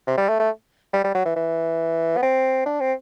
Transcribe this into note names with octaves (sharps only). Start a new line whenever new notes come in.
C3
G3
A3
A3
G3
G3
F#3
E3
E3
B3
C4
D4
C4